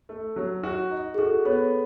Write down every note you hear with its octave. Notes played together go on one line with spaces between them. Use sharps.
A3
F#3
F#4
D#4
G#4
F#4 A4
B3 C#5